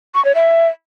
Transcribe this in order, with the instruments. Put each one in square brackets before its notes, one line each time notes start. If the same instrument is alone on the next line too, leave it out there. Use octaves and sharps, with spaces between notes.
[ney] C#6
C#5
E5